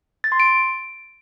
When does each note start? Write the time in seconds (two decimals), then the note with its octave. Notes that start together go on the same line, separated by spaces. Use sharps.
0.24 A6
0.32 C6
0.40 D7